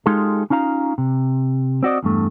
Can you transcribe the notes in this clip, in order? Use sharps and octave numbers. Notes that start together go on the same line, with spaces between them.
G#3 D#4 F4 G4 A4
C#4 D#4 F4 F5 A#5
C3
C4 F#4 D5 D#5
E2 G2 A3